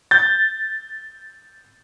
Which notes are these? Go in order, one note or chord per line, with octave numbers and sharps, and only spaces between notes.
G6 A6